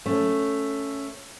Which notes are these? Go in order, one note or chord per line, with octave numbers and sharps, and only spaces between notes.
A3 C#4